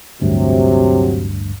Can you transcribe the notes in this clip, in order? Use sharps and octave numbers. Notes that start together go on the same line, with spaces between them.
A1 D2 G2 C3 F#3